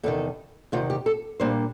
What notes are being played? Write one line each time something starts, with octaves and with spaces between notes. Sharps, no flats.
E2 C3 D#3 A4
E2 C3 D#3 F4
G4
A4
A#2 G3 A#3 D4 C5